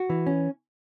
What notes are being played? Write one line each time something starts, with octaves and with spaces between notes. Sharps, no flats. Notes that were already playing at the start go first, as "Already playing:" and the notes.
Already playing: F#4
E3
C#4